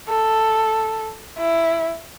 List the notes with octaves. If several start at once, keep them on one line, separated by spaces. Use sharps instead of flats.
A4
E4